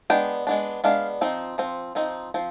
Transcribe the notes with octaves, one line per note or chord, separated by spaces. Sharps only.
G#3 B3 D4 G5
G#3 B3 D4
G#3 B3 D4 F5
F3 C4 D#4
F3 C4
F3 C4 D#4
F3 C4